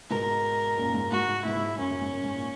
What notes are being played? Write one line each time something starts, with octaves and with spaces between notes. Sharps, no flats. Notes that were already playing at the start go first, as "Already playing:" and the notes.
G#2 B2 A#4
F#2 A#2
G#2
G#2 F#4
G#2
G#2 B2 E4
G#2
F#2 C#4
F#2
G#2
F#2
G#2
A#2